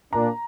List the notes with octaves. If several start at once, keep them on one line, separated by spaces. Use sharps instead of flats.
A#2 A#3 D4 A#5